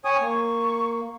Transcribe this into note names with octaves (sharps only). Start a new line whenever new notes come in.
C#5 G5 G#5 D#6
A#3 C#6